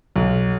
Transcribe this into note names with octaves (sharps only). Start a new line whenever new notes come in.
B1